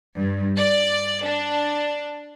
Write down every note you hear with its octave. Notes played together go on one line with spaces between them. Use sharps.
G2
D5
D4